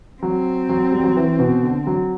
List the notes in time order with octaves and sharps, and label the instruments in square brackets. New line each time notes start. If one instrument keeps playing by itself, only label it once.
[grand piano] F#3 [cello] C4
[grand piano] F#3
G3
F#3
E3
B2
D3
F#3